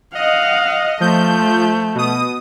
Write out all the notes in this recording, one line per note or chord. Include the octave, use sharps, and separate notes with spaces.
D#5 F5 F#5
F3 A3 G6
B2 D#6